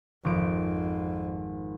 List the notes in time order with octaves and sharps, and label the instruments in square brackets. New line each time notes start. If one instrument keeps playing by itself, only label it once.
[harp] G#1 F3 D7 [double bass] F2